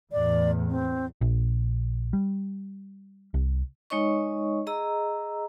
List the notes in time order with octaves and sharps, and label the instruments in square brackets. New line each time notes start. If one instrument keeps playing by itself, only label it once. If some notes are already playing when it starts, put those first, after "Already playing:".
[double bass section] E2 A2 [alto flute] D5
[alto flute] C4
[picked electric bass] A#1
G3
C2
[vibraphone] G#3 D#4 C#5 D#5 C#6
G#4 D#5 A#5 E6